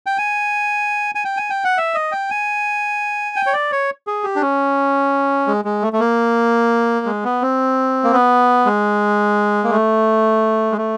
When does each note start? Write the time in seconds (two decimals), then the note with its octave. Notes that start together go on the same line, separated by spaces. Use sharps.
0.06 G5
0.18 G#5
1.15 G#5
1.25 G5
1.37 G#5
1.50 G5
1.64 F#5
1.78 E5
1.94 D#5
2.12 G5
2.30 G#5
3.36 G5
3.46 C#5
3.53 D5
3.72 C#5
4.07 G#4
4.24 G4
4.36 D4
4.42 C#4
5.47 G#3
5.65 G#3
5.82 A3
5.93 A3
6.00 A#3
7.06 G#3
7.24 B3
7.42 C4
8.04 A#3
8.13 B3
8.66 G#3
9.64 A#3
9.71 A3
10.72 G#3
10.78 A3